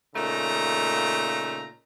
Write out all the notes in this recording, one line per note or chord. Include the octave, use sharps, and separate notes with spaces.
A#2 C#3 A3 D#4 A#5